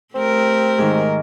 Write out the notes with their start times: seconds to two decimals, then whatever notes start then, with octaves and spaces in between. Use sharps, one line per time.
0.15 A3 C4 G4 A#4
0.78 G#2 D#3